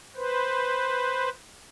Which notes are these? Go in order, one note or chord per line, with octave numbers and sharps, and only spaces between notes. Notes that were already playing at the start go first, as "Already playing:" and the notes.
B4 C5